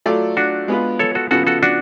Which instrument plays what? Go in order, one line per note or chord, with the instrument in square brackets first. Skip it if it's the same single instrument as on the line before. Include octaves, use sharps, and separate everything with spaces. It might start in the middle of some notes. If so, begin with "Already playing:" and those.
[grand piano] F#3 A3 F4 A4 D5
[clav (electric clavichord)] D4 F#4
[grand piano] G#3 B3 F4 B4
[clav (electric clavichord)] A4 C#5
F#4 A4
[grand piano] C#3 F3 B3 [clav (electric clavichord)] F#4 A4
[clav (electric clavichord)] F#4 A4
D4 F#4